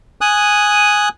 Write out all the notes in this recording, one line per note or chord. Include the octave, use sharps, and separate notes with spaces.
G#5 D#6 F#6